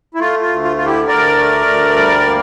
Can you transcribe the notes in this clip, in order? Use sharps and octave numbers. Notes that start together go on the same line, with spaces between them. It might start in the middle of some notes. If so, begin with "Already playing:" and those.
E4
A3 F4
F4
D2
F4
D3 F4
E4 G4
D2 A#4 D5
A3
D2
G3
A#3